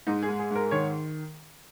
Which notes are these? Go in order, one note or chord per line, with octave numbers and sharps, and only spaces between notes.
G#2 D#4
G#4
G#3
G#4
G#2 A#4
D#3 C#5